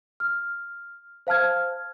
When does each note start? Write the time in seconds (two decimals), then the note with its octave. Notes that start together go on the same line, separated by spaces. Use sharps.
0.20 F6
1.27 C5 F5 A5 F6 G#6